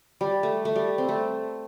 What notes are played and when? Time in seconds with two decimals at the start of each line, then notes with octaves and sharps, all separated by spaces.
0.21 G3
0.43 A3
0.65 A3
0.76 G3
0.98 C4
1.09 A3